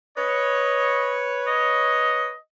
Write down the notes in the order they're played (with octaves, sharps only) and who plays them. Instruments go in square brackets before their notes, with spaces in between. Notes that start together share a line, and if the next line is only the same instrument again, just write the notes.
[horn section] B4 C#5 [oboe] D#5
[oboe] D#5